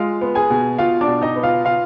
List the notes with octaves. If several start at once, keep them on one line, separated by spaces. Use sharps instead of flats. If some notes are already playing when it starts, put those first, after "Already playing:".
Already playing: G#3 F4 F5
B3
G#4 G#5
B2
B2 F4 F5
D4 D5
B2
D#4 D#5
B3
F4 F5
F4 F5